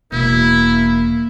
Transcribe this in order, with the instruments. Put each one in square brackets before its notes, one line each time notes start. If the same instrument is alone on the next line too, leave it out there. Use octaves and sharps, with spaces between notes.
[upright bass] E1 [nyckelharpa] A#3 [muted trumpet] E4